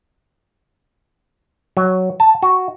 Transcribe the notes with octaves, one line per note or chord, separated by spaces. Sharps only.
F#3
A5
F#4